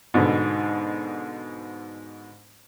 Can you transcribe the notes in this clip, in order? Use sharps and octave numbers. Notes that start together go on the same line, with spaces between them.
G#2 B2 D3